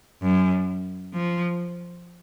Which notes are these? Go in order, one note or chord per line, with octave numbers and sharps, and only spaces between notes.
F#2
F3